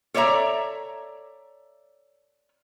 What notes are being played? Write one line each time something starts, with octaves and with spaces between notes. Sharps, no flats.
A4 C#5 D5 E5 A#5